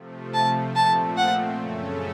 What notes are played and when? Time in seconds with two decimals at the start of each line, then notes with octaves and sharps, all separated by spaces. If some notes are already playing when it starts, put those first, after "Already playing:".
Already playing: C3 F3 A3
0.34 A5
0.76 A#2 F3 A3 C4 A5
1.17 F#5
1.59 F#2 C#3 A3 C#4 A4